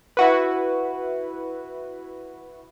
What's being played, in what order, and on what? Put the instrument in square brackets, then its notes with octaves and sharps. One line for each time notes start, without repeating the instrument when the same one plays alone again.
[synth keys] E4 F#4 B4